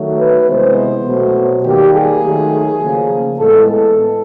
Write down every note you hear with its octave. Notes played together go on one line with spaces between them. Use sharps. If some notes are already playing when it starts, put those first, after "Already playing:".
Already playing: D#3 F#3 A3
B4
C3 E3 G#3 B3 C5
B2 F#3 A3
D#3 G3 A#3 G4
G#4
D#3 F#3 A3
C#3 F3 A#3
A2 E3 G#3 B3 A4
A4